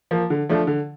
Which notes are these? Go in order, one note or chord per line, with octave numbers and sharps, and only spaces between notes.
F3 A#3
D3
F3 A3 D4
D3